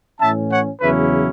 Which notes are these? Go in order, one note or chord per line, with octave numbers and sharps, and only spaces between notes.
A2 E3 C#4 E5 A5
C#5 F#5
E2 C#3 F#3 C#4 E4 B4 E5